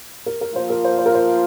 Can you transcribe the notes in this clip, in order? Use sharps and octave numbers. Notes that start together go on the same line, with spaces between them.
A#4
A#4
F3 A#3 F4 C5
A#4
C5
C5
A#4
C5